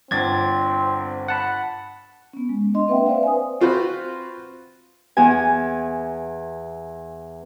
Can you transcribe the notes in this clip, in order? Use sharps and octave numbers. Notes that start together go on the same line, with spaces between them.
G1 C4 D4 G#6 A6
F#5 A5 B5
B3 C#4
G#3
D4 D#5 C6
A#3 C4 B4 E5 F#5 G5
B4 C5 D5 E5 F5
G#5 D#6
C4 F4 F#4 B4 C5
E2 G#5